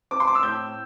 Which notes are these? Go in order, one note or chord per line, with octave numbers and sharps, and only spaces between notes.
C4 D6
C6
D6
E6
A2 G6